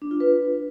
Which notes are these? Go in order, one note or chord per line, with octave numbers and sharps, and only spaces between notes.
D4
F4
B4